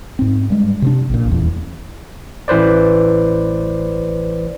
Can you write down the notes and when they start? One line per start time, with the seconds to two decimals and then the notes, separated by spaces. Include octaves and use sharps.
0.19 G#2 C4
0.50 G2 G#3
0.82 C3 C4 D4
1.10 A#1 A#2
1.28 D#1 E2
2.48 A1 E3 B4 C5 D5